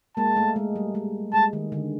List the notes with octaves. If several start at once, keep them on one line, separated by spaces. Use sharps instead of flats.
G#3 A#3 A5
A3
G#3
G3
G#3
G#3 A5
D#3
D3